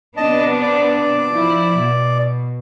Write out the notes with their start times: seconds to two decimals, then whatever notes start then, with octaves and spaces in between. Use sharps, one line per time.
0.17 C3 B3 D4 D#5 A5
0.62 D5
1.31 F3 E4
1.77 B2